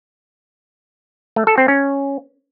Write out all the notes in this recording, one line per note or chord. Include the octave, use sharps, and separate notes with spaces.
A3
A4
C4
C#4